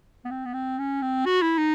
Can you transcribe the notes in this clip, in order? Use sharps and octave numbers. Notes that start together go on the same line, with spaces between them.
B3
C4
B3
C4
C#4
C4
F#4
E4
D#4